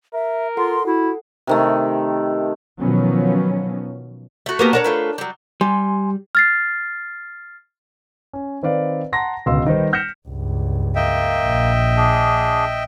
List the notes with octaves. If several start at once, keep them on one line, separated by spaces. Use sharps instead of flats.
A#4 E5
F4 A4 F#5 C6
E4 F#4
C3 D#3 A3
B2 D#3 F3 F#3 B3 C#4
A3 F#4
A#3 B3 G4
D4 A#4 C#5 F#5
A3 F4 B4
F#3 G3
G3 G#5 C6
F6 A6 C7
C#4
D#3 C4 B4 D5 F5
F#5 A5 A#5 C6 A#6
D1 C#2 B2 F5 C6 E6
D#3 G3 D#4 B4 C5
F6 G6 A#6 B6 C#7 E7
C#2 G2
A#3 D#5 E5 G5
A#1
D4 G#4